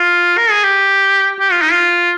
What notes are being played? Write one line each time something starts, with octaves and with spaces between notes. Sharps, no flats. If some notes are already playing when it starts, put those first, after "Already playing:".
Already playing: F4
A#4
G#4
G4
G4
F4
D#4
F4